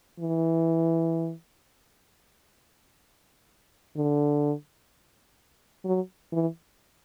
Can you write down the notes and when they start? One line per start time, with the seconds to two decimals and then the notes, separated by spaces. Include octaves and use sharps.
0.20 E3
3.96 D3
5.85 F#3
6.32 E3